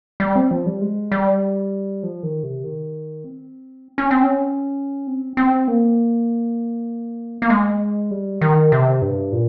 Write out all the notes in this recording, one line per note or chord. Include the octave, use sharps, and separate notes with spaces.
G3
C4
F3
G3
G#3
G3
F3
D#3
C3
D#3
C4
C#4
C4
C#4
C4
C4
A#3
A#3
G#3
G3
D#3
C3
G2
A#2